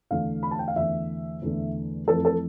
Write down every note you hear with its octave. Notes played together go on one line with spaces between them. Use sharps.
E2 D3 A3 F5
B5
A5
G5
F5
E2 D3 A3 E5
E2 D3 A3
F2 E3 A3 A4
A4